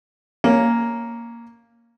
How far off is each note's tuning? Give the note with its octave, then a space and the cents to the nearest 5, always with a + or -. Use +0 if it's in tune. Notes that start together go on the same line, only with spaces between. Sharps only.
A#3 +0 C#4 +0